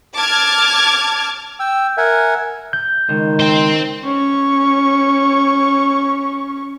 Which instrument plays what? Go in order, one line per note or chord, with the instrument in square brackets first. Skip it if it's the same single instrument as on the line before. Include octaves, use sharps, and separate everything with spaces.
[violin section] A5 D6 F6 G#6
[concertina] G5 E6
A#4 E5 F#5 G#5
[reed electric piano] G6
[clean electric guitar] C#2 [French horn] D#3
[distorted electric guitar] C5 G5
[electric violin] C#4 C#6